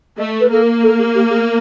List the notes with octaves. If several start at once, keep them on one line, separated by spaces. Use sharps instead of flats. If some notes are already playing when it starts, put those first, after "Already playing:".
A3 D#5
B4
A#3 A4
A#4
A4
G#4
G4
G#4